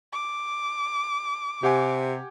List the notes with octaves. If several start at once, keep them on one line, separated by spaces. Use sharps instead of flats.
D6
C3 G4 F#5 G#5